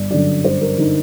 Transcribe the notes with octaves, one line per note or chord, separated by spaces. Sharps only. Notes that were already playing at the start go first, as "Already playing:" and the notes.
Already playing: G1 D5
F#2 D3 D5
G1 C5
A#4
D3 D#4